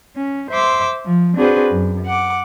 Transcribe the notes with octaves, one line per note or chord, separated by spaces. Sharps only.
C#4
C5 E5 C6 D6 E6
F3
C4 D4 F#4 G#4 B4 C5
F#2
F#5 D6